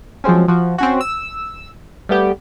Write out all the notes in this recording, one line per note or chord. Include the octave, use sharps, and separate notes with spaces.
F3 F#3 G#3 C4 C#4
F3 F#4
C4 C#4 F#4
E6
G3 A3 B3 G4